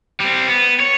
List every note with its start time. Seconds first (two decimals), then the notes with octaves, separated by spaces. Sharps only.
0.20 G3 C4
0.49 B3
0.80 C#5